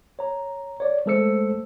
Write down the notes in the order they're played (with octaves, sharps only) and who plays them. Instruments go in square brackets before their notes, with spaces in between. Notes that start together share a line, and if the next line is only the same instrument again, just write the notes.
[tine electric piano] C#5 A#5
C#5 D5
G#3 A3 A4 C5 E6 C#7